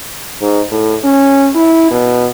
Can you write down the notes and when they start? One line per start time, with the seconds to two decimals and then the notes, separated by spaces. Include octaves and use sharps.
0.41 G#2
0.71 A2
1.04 C#4
1.55 E4
1.91 B2